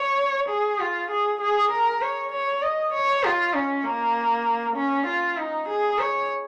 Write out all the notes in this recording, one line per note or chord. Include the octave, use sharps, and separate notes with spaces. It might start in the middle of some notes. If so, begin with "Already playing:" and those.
Already playing: C#5
G#4
F4
G#4
G#4
A#4
C#5
C#5
D#5
C#5
F4
C#4
A#3
C#4
F4
D#4
G#4
C#5